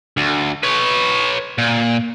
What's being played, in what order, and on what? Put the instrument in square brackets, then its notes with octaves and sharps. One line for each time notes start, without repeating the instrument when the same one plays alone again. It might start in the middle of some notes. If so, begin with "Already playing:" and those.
[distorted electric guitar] D2
B4 C#5
A#2